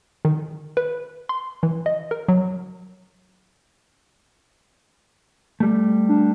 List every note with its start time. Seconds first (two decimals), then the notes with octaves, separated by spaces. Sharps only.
0.25 D#3
0.77 B4
1.29 C6
1.63 E3
1.86 D#5
2.11 A#4
2.28 F#3
5.60 G3 A3
6.09 D4